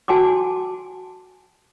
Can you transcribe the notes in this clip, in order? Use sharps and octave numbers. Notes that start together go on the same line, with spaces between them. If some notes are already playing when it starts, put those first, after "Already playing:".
F#4 G#5 A5 C6 D6